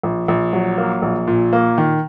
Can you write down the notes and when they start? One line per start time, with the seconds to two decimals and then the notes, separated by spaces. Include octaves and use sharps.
0.03 A#1
0.28 A#1
0.53 F#3
0.78 A#3
1.02 A#1
1.27 A#2
1.53 A#3
1.78 D#3